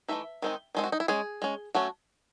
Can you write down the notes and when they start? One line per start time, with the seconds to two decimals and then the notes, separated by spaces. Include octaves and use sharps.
0.08 E3 A3 D#4 E5
0.42 D#3 G#3 C4 D#4
0.75 D#3 G#3 C4 D#4
0.84 F#4
0.92 D#4
1.00 E4
1.08 G#3 C#4 G#4
1.42 G#3 C#4
1.75 F#3 A3 C#4 F#4